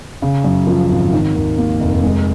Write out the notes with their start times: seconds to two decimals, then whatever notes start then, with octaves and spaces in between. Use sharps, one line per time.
0.22 C#3
0.44 F#2
0.67 F3
0.90 G#1
1.13 D#3
1.35 D#2
1.57 A#3
1.80 F1
2.03 G#3